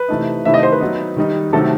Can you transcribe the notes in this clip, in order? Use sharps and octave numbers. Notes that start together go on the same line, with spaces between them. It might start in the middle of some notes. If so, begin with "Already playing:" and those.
Already playing: B4
C3 E3 A3 D#4
C3 D#3 A3 E4 E5
D#5
C5
B4
F#3 B3 D#4
D#3 G3 D#4
C3 D#3 F#3 A3 A4